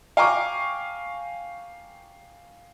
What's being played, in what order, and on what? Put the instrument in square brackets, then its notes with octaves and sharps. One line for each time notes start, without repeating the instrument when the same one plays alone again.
[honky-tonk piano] F5 G5 G#5 A#5 C#6 D6